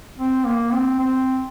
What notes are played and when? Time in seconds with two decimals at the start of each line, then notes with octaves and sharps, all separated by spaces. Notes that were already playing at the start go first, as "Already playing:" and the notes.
0.18 C4
0.46 A#3
0.72 C4
0.99 C4